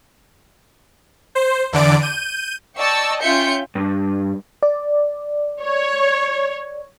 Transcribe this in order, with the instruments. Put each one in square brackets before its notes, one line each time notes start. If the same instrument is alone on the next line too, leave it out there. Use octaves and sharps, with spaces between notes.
[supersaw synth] C5
E2 D3 D5 D7
G6 D#7
[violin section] D5 D#5 G5 A5 C#6 E6
C#4 F4 E5 G5 G6 C#7
[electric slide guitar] G2
[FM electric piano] D5
[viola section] C#5